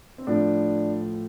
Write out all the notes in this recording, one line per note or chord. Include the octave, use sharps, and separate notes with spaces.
C4
A2 F3 D4